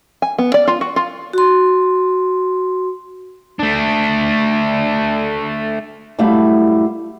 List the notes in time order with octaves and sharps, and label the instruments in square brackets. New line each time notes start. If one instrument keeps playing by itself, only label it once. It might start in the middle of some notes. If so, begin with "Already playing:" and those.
[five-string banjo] G#5
B3
D5
F4
F#4
F4
[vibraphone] F#4 C6
[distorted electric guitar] A3 D4
[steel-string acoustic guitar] F#2 G3 A3 E4 F5